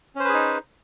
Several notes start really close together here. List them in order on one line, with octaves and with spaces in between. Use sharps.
C#4 C5 B4 G#4 D#4